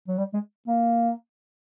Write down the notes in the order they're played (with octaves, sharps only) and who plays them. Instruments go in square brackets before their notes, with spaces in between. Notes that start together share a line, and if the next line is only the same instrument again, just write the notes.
[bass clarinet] F#3
G3
G#3
A#3